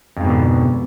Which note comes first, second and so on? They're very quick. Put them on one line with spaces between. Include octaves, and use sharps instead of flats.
F2 G#2 B2 D3